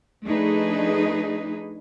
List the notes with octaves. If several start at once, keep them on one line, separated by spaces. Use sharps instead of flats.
F3 A3 D4 D#4 G#4 B4